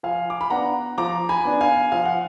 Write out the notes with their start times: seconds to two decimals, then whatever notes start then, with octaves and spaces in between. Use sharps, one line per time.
0.03 F3 F5 G#5
0.30 D6
0.41 B5
0.50 B3 D4 F#5 A#5
0.98 F3 A#5 D6
1.29 G#5 B5
1.45 B3 D4
1.61 F5 G#5
1.92 F3 F5
2.05 F#5